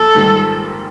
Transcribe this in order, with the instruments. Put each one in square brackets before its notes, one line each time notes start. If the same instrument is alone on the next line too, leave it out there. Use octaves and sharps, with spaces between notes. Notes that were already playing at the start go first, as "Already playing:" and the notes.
Already playing: [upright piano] A#1 [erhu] A4
[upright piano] G#2 D#3 G3 A#3